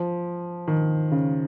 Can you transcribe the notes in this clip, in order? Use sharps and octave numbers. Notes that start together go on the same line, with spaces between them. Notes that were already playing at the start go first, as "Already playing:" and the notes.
Already playing: F3
D#3
C#3